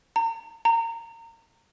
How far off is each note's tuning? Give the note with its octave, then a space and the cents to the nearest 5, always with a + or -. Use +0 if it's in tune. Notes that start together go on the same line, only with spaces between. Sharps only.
A#5 -35
A#5 -25